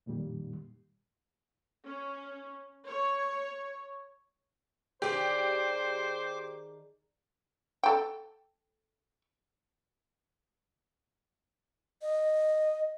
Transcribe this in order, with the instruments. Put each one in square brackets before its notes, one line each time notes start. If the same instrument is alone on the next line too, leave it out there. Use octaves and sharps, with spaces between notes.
[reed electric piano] F2 A#2 D#3 G3
[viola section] C#4
C#5
[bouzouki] D#3 D4 G#4 [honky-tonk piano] G4 [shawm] C5 [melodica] D6
[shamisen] A4 G5
[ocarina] D#5